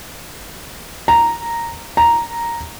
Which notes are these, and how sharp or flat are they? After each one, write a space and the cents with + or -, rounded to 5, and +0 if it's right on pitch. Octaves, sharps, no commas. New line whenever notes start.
A#5 -5
A#5 +0